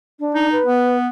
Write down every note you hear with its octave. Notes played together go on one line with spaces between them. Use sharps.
D4
D#4
B4
B3